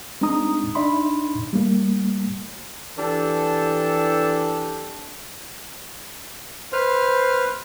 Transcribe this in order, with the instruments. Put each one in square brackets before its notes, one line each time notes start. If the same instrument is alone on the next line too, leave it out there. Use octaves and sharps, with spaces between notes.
[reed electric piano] G#3 C4 D4 D#4 A#5 D#6
D4 D#4 D5 E5 B5 C6
G3 A3 A#3
[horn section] E3 D4 G4 A4
[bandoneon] B4 F6 [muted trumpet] C5